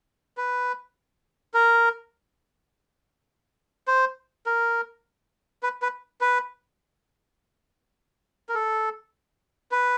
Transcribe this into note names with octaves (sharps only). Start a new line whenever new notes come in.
B4
A#4
C5
A#4
B4
B4
B4
A#4
A4
B4